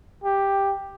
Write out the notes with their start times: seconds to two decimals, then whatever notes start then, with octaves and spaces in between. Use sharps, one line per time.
0.24 G4